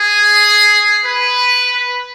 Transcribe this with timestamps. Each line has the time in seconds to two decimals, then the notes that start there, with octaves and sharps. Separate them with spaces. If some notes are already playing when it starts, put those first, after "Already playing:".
Already playing: G#4
1.04 B4